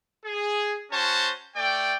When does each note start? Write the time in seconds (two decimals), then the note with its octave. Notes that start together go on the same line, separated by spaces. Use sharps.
0.24 G#4
0.92 C#4 F#4 C5 A5
1.55 A3 D5 G5